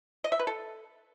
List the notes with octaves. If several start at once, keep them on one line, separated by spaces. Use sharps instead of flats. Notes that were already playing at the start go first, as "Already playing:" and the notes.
D#5
E5
B4
A4